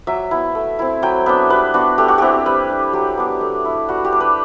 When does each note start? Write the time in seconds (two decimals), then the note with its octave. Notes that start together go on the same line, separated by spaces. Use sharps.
0.07 F#3 E5
0.31 B3 E4
0.55 A3
0.79 C4 E4
1.02 F#3 G5
1.26 B3 D4 E5
1.50 G3 B4
1.74 B3 D4 F#4
1.98 A3 G4
2.08 F#4
2.18 C4 E4 G4
2.46 G3 B4
2.70 D4
2.93 F#3 G4
3.17 B3 D4
3.41 A3
3.65 E4
3.89 G3 F#4
4.05 G4
4.12 D4
4.21 B4